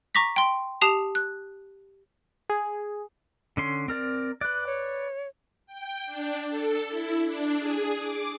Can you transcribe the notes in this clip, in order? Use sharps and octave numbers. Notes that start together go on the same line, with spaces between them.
A#5 C#6 D6 A#6 B6
G5 C6
G4 A5 D#6 C7 F7
F#6
G#4
D3 C#4 C6
C4 A#4 D5
B4 D5 F#6
C#5
G5
D4
A4
E4
D4
G#4
D6